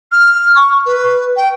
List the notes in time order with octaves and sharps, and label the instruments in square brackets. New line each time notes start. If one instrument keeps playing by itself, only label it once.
[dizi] F6
C#6
B4
G5